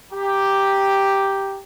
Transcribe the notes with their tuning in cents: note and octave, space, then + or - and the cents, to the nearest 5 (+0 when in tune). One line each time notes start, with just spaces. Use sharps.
G4 +0 A#5 +0